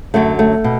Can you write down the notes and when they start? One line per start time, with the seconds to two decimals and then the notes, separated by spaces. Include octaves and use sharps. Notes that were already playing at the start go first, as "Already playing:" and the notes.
0.14 F#2 D3 F#3 A3
0.39 A3
0.64 B2